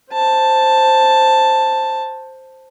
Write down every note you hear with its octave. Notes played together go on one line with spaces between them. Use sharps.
C5 A5